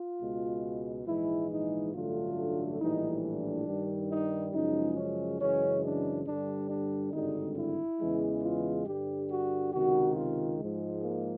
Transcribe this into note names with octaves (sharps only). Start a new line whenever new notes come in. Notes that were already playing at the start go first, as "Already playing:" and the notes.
Already playing: F4
C#2 B2 G#3
A#1 G#2 E3 G#3 E4
D#4
A1 G2 D3 F#3 A3 F4
A#1 A2 E3 G3 D#4
D4
G2 D#3 G3
D#4
F#2 C#3 F3 G#3 D#4
C#4
F#2 C#3 E3 G#3 C#4
D4
G2 D3 G3 D4
D4
G#1 G2 D3 G3 D#4
E4
E2 C#3 E3 G#3
F4
G2 D3 G3 G4
F#4
C#2 C3 D#3 F#4
F4
G#2 F3 G#3
A#3